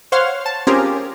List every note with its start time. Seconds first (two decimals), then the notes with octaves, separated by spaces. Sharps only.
0.12 C5 C#5 F5 F#5 C6 F6
0.46 A5
0.67 C4 C#4 F4 G4 G#4 A#4